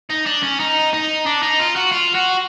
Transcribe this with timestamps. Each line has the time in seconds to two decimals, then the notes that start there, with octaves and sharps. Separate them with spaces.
0.10 D#4
0.26 D4
0.43 C#4
0.60 D#4
0.93 D#4
1.26 D4
1.43 D#4
1.60 F4
1.76 F#4
1.92 F4
2.15 F#4